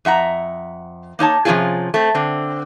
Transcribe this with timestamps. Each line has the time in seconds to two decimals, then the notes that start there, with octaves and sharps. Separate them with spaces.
0.05 F2 E5 F#5 A#5
1.19 A#3 D#4 C#5 A5
1.45 C3 F3 A#3 C#4 F4 G#4
1.94 A3 C4
2.15 D3 C4